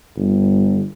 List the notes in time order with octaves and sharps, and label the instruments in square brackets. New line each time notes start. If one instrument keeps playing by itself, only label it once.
[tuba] G1